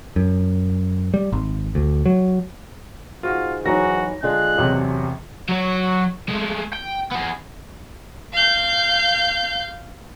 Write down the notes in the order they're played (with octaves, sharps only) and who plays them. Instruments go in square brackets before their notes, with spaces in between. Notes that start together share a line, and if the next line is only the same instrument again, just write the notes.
[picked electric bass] F#2
G3
G#1
D2
F#3
[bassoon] G#2 [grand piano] F4 F#4
[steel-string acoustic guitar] E3 F#3 D#4 [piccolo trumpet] F#4 [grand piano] A#5 A#6
[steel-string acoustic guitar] D3 F4 [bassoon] G#3 [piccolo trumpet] F#6
[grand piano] A1 E2 C3 [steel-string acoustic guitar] F#3
[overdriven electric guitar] F#3 C#5
G#3 A3
G5
B3 G#4
[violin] F5 G6